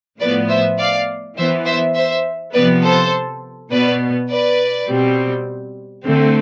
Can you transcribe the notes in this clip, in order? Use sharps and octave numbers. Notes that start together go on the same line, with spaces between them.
A2 F3 B3 B4 D5
C5 E5
D5 F5
E3 B3 C5 E5
C5 E5
C5 E5
C3 F3 B3 B4 D5
A4 C5
B2 B3 B4 D5
B4 D5
B2 G3 C4
D3 A3 C4